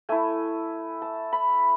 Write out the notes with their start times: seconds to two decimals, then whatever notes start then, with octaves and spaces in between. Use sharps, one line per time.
0.09 A3 E4 G#5
1.02 A5
1.33 B5